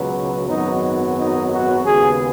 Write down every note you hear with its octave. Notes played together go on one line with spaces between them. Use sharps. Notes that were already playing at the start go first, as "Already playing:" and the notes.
Already playing: C#2 B2 F#3 B3
G#1 F#2 F#3 B3 D#4
D#4
F#4
D#2 C#3 G#3 B3 G#4